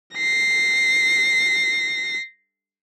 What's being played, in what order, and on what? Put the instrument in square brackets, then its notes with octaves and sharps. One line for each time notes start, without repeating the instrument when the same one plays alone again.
[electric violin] A#6 C7